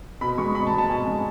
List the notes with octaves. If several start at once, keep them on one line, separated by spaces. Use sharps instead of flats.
B2 B5
G#3 C#6
B2 B5
A5
G#3
A5
B2 G#5
G#3